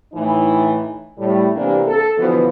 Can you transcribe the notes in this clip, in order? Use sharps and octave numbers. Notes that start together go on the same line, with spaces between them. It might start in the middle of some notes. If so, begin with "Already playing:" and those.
A2 E3 D#4
A2 G3
C3 E3 A#3 D4
A4
B2 D3 E3 F3